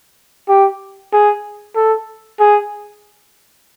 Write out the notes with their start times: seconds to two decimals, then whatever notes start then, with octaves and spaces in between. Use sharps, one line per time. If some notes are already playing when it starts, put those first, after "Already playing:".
0.49 G4
1.13 G#4
1.75 A4
2.40 G#4